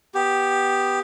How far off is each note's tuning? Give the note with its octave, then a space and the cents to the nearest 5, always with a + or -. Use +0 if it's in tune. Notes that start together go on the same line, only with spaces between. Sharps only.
B3 +0 G4 +0